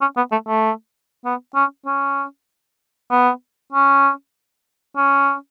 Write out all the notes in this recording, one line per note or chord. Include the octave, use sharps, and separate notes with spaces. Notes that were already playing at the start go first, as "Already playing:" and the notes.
C#4
B3
A3
A3
B3
C#4
C#4
B3
C#4
C#4